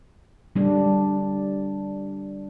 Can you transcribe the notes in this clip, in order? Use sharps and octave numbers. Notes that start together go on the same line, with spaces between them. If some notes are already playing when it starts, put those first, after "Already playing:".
G3 D4